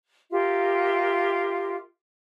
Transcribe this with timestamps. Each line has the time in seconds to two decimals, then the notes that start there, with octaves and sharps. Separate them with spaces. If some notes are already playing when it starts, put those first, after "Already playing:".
0.31 F4 G4 A#4 E5